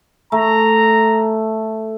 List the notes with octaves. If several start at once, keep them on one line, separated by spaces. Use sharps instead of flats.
A3 A#5